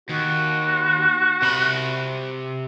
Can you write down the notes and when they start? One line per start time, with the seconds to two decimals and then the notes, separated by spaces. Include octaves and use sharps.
0.09 D#2 F#4
1.42 C3 B5